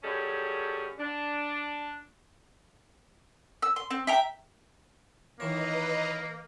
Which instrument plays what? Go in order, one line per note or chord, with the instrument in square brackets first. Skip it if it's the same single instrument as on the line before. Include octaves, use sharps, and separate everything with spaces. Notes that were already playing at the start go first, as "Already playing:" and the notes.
[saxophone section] F#2 G3 C#4 G#4 A4
D4
[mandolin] E6
C6
C4
E5 G5 A#5
[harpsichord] D#3 E3 C#5 [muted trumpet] A#3 [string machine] B4 D#5 A#5